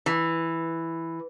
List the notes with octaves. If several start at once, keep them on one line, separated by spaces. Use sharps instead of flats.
E3